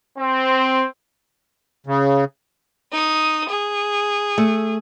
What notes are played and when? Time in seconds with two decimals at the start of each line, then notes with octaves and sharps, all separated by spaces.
0.18 C4
1.87 C#3
2.92 D#4 D#6
3.48 G#4
4.38 A3